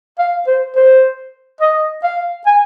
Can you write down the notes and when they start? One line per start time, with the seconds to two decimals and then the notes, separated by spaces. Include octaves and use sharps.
0.19 F5
0.47 C5
0.76 C5
1.61 D#5
2.04 F5
2.46 G#5